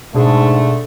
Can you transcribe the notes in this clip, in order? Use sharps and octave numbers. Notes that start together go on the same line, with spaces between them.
G#2 B2 D3 A3 G#4